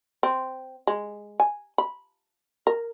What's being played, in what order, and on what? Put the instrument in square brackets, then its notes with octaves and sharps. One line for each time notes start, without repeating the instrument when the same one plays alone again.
[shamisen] C4
G#3
G#5
B5
A#4